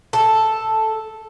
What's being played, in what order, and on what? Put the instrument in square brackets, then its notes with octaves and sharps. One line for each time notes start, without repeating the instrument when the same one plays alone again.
[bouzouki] A4